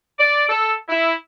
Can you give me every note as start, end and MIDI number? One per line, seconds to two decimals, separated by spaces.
0.18 0.47 74
0.49 0.73 69
0.88 1.13 64